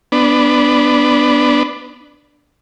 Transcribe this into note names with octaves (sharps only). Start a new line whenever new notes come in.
B3 D4